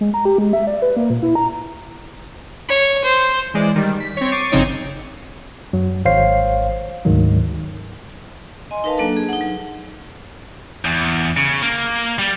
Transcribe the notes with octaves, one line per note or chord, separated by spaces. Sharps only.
G#3
A#5
G4
G#3
E5
D5
B4
A#3
A#2
E4
A#5
C#5
C5
E3 G#3 D5
D#3 G3
B6
C4 C#5
C#6 D6 A6 C7 C#7 D#7
G1 C#3 F3 C4 D#4 C#5
F#2 F#3
G#1 C5 C#5 F5 C7
D2 G#2 D#3 F#3
D#5 G#5 C6
D#4 A#4 B4 F5 A5
F#3 A#3 D4 A4
G#4
D#4 F#5
F#3
E2
C#3
A#3
G3